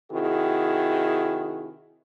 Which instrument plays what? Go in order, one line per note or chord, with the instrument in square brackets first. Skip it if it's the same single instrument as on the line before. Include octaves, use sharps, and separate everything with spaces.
[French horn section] C3 D#3 E4 F#4 G#4